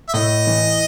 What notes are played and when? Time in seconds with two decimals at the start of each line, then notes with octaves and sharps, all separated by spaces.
0.08 E5
0.14 A2 D#5
0.47 E3